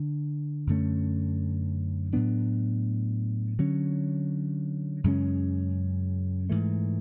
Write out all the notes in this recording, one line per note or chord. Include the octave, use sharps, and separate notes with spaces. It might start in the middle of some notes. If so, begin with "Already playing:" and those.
Already playing: D3 D4
F#2 D3 A3 C#4
A2 F#3 B3 D4
D3 F#3 C#4
F#2 C#3 G#3 C#4
G#2 E3 A3